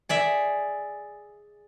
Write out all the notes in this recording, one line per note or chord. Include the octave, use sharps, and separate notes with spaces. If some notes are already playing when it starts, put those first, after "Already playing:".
G#4 D5 E5